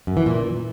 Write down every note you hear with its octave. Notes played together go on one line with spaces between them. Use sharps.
F#2
E3
A#2